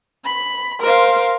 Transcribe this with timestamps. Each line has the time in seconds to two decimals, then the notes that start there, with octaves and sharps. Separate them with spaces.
0.25 B5
0.80 A#4 C5 F5